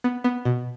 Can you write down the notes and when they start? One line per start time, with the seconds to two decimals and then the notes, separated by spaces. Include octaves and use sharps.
0.04 B3
0.24 B3
0.45 B2